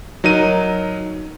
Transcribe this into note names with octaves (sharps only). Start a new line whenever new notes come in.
F#3 D#4 A#4 D#7